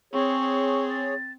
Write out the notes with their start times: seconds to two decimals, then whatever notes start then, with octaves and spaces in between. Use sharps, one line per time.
0.14 C4 G#4 C#5 C#6
0.89 A6